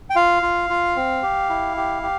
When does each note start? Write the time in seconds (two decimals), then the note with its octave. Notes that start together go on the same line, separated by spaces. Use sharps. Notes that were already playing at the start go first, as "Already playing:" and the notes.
0.10 G5
0.16 F4 F5
0.42 F4
0.70 F4
0.96 C4
1.23 G4
1.50 E4
1.77 G4
2.03 G4